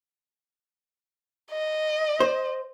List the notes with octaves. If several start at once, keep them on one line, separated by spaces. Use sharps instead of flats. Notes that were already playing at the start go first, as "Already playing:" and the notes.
D#5
C5